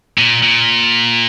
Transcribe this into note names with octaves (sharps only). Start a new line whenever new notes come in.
A#2
A#2